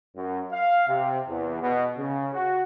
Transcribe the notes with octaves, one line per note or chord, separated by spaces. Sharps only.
F#2
F5
C3
E2
B2
C#3
F#4